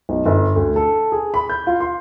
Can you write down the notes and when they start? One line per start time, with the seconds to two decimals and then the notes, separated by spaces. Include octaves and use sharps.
0.09 B1
0.26 G1
0.56 D2
0.76 A4
1.12 G#4
1.34 B5
1.50 G6
1.67 F4
1.80 C6